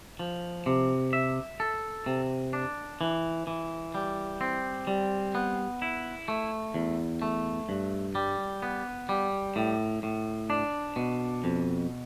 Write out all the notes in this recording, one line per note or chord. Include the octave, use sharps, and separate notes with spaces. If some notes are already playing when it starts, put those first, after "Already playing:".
F3
C3
E5
A4
C3
D4
E3
E3
G3
C4
G3
B3
E4
A3
E2
A3
G2
G3
B3
G3
A2
A2
D4
B2
F2